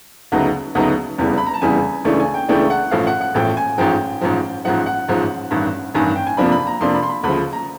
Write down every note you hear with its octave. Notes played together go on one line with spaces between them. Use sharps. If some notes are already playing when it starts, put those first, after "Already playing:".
D2 C#3 F#3 B3 D#4
D2 C#3 F#3 B3 D#4
F1 E2 C#3 E3 G3
B5
A#5
A5
F1 E2 C#3 E3 G3 G#5
C#2 C#3 E3 A3 D4
G#5
G5
C#2 C#3 E3 A3 D4 G5
F#5
A1 A2 F3 F5
F#5
F#5
A1 A2 F3 G5
G#5
A1 G#2 F3 G5
A1 G#2 F3
A1 G#2 F3 F#5
F#5
A1 G#2 F3
A1 G2 D#3
A1 G2 D#3 G#5
G5
G#5
F2 C3 F3 A#3 D4 B5
B5
A#5
F2 C3 F3 A#3 D4 C6
B5
C6
B5
D2 C#3 F3 B5
A#5